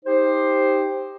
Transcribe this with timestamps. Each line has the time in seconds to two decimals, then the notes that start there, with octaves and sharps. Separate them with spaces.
0.05 D#4 G4 C5